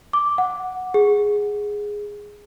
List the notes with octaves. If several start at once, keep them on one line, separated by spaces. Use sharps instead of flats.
D6
F#5
G#4